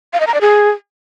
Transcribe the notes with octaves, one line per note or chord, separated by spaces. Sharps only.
F5
D#5
A#5
D5
G#4